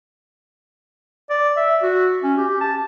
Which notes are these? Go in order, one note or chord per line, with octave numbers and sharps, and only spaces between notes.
D5
E5
F#4
C#4
G4
A5